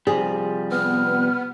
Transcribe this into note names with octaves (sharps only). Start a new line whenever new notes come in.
C3 F3 G3 G#4
B3 F6